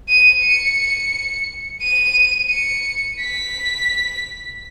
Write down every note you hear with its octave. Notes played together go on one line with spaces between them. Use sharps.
D#7
C#7
D#7
C#7
B6